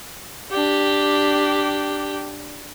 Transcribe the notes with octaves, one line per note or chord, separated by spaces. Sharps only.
D4 G4